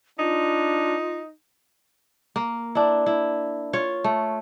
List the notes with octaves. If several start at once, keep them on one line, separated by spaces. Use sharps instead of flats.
D4 D#4 F4
A#3
D4 E4
E4
F4 C#5
A3